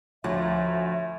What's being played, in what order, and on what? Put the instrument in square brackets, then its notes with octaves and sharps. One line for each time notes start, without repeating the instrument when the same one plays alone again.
[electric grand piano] D2 [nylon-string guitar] F3 F4 [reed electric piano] C#5 [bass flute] E5